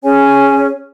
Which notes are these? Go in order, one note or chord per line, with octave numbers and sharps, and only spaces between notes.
C#4 G#4 C#5 G#5